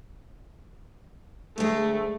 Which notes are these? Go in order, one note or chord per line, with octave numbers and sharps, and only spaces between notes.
D2 G#3 A3